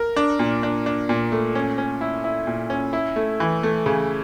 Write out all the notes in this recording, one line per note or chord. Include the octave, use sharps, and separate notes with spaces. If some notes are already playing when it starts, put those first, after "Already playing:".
Already playing: A#4
D4
A#2
D4
D4
A#2
A3
C#4
C#4
E4
E4
A#2
C#4
E4
A3
E3
A3
C#3